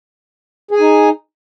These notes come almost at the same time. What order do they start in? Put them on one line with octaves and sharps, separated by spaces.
G#4 G#5 D#4